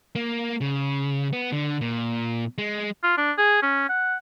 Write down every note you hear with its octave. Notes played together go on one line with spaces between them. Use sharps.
A#3
C#3
B3
D3
A#2
G#3
F4
D4
G#4
C#4
F#5